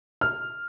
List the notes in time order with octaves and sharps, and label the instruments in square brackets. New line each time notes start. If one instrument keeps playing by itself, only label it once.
[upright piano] F6